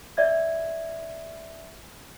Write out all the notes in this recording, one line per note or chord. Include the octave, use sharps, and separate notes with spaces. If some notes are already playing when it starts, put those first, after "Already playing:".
D5 E5 G#6